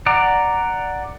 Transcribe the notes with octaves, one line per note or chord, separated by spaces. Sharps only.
D5 F#5 A#5 D6